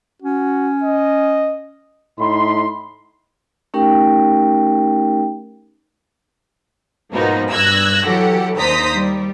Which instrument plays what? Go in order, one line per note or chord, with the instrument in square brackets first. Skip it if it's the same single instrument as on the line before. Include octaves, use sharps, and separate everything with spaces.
[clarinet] C#4 [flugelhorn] F#4
[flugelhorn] D#5
[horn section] A2 D#4 B5 C6
[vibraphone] A3 C#4 D#4 G4 A#4 G5
[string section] G#2 B2 F3 A#3 B3 D#4
G2 E6 F#6 G#6 A#6
E3 F#3 G4 A4 F#5
D#2 D4 C5 A#5 D#6 B6
G3